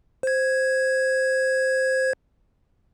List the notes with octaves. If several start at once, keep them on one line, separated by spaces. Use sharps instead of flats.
C5 G#6